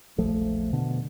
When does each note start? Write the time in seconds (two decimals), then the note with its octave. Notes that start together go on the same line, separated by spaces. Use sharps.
0.18 E1 A#1 F3 A3
0.73 B2 D3